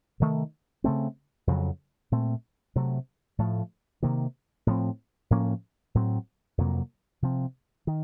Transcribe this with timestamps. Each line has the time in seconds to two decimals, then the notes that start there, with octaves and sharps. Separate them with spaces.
0.20 C3 D#3 A3
0.84 C#3 A3 C4
1.47 F2 C#3 F#3
2.12 A#2 A3 C4
2.76 C3 F#3 A3
3.38 A2 F3 A3
4.03 C3 D#3 A#3
4.67 A2 F3 C4
5.30 A2 F3 A#3 C#4
5.95 A2 F#3 C4
6.58 F2 C3 F#3 A#3
7.22 C3 F3 C4
7.87 D#3